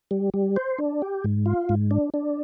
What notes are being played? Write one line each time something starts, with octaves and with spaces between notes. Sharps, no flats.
G3
G3
C5
D4
G4
G#2
F4
G#2
D4
D4